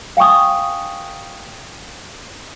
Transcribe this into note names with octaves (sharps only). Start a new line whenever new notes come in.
F5 G5 G#5 C#6 D#6